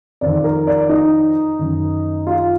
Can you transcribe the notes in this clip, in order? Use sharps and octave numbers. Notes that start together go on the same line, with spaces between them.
F2 D#3 D5
A#4
D5
D#4
F#2 D#3
F4